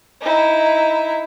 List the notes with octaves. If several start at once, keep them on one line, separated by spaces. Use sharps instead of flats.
D#4 E4